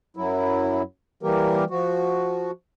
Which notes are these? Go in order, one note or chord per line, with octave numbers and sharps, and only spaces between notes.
F#2 F#3 E4
E3 G3 A#3 G4 A#4
F3 F#4